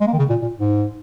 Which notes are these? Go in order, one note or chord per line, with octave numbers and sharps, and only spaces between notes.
G#3
A#3
D#3
C#3
A#2
A#2
G#2